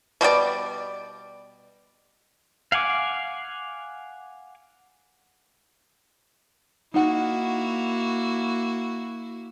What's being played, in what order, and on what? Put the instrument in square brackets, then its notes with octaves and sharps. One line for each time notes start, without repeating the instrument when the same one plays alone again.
[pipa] B2 G3 B3 D5
[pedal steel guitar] F5 F#5 G#5 D6
[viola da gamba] A#3 E4 F#4 [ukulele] D#4 F#5